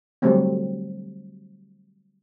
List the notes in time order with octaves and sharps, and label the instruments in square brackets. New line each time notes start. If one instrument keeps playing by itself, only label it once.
[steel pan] D3 F#3 G3 A3 C4